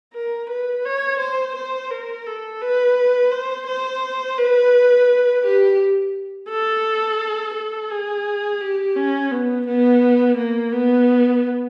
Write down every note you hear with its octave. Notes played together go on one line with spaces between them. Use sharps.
A#4
B4
C#5
C5
C5
A#4
A4
B4
C5
C5
B4
G4
A4
A4
G#4
G4
C#4
B3
B3
A#3
B3